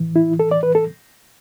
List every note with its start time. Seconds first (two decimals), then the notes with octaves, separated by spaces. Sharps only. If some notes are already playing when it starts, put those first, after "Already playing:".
Already playing: A2 E3
0.16 E4
0.39 A4
0.51 D5
0.63 B4
0.75 A4